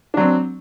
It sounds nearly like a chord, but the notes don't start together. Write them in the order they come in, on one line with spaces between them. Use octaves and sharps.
D4 F#3 C4